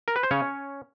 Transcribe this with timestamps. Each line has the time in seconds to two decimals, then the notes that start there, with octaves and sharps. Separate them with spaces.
0.08 A#4
0.16 B4
0.23 C5
0.31 C#3 C#4 C#5